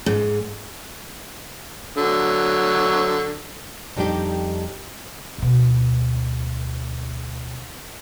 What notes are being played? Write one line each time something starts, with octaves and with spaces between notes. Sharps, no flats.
G#2
D3 F#3
F2 G3 D4 D#4 G4
D2 B2